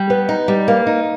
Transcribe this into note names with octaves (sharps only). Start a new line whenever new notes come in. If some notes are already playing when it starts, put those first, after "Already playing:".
Already playing: G3
B3
D#4
G3
A#3
D#4